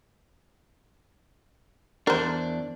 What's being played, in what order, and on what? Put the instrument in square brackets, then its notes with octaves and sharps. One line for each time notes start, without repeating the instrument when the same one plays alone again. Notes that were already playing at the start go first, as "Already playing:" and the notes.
[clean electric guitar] E2 D4 [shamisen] A#4 C5